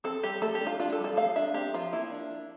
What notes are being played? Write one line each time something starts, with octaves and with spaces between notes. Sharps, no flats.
C4 A4
G3 G4
A3 A4
G4
D4
F4
D4 F4
A4
G3
A4
A3 F5
D4 E5
C4 G4
F3 F4
A#3 E4
D4